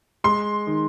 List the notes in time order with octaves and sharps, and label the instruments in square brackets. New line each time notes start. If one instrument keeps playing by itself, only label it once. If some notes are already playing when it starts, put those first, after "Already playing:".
[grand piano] G#3 [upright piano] C6
[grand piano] D#3